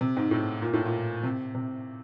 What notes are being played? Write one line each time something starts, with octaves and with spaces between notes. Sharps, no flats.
C3
G#2
A2
A#2
A2
A#2
C3
C3